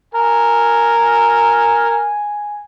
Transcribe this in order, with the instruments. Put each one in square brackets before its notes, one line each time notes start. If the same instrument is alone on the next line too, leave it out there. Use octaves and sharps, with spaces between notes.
[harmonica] A#4 [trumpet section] G#5